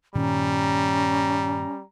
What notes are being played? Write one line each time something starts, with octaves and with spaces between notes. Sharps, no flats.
G2 A#2 D#3 G3 C#4 A#5